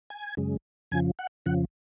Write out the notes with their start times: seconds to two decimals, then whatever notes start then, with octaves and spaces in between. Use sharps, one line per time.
0.10 G#5
0.37 F#2 C#3 G#3
0.92 F2 C#3 F3 G#5
1.19 F#5
1.46 F2 C#3 F3 F#5